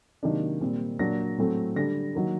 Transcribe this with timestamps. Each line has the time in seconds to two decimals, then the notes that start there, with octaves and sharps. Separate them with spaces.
0.23 C3 D#3 F#3 A#3 D4
0.61 A#2 G3 C4
0.99 A#2 F#3 A#3 D4 A#6
1.38 A2 F#3 A3 C4
1.76 D3 G3 D4 A#6
2.15 D#3 F#3 A#3